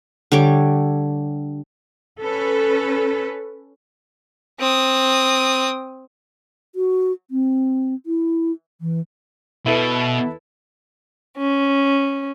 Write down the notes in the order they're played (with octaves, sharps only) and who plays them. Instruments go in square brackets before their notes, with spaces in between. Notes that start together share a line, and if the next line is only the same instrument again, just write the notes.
[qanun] D3 G3 C#5 D6
[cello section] C#4 A4 B4
[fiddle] C4 D#6
[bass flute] F#4
C4
E4
E3
[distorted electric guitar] B2 [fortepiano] E4 A4 B4
[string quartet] C#4